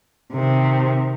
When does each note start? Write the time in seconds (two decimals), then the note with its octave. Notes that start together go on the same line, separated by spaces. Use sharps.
0.33 C3 D#3